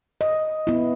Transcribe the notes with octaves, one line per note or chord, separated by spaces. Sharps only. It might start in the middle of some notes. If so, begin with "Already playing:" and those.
D#5
B3 E4